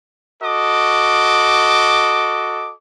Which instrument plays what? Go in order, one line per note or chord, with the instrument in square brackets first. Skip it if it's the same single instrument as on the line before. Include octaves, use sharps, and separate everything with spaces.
[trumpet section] F#4 A4 D#5 D6